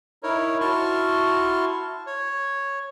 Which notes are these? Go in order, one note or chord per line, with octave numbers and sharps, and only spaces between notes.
D#4 E4 A#4 C#5
E4 F#4 A5 C6 C#6 F6
C#5